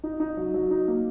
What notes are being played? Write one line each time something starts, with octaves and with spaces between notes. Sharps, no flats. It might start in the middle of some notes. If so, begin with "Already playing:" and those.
D#4
D#4
F#3
F#3
D#4
A#3